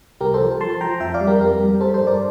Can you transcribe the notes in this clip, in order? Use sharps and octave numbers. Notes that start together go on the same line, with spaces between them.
C2 G4 A#4
A4 C5
F3
F3 A5 C6
F3 G5 A#5
F2 E5 G5
D5 F5
G3
G4 A#4
F2 G4 A#4
G3
G3 A4 C5
A4 C5
G2
A#4 D5